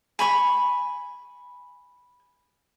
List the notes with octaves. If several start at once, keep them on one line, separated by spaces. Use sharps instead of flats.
G#5 B5 C#6